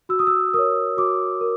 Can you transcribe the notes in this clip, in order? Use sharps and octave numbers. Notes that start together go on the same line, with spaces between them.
F#4 E6
D#6
E6
A#4 C#5 D#6
F#4 D6
A#4